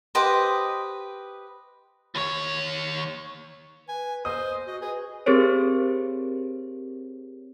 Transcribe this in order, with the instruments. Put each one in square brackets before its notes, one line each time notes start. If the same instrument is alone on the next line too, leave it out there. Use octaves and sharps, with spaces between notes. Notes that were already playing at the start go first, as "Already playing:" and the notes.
[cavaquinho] G4 B4 C5 D#5
[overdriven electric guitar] D#2 C#5
[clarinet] B4 [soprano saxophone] G#5
[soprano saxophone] C5 [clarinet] D#5 [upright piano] D#6
[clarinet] F#4 [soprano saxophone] D#5
[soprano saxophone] G#4 [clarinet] B4
[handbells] C4 G4 G#4 A#4 C5 C#5